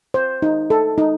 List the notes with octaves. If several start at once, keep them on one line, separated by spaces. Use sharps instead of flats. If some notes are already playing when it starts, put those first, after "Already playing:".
C5
D#4
A4
D#4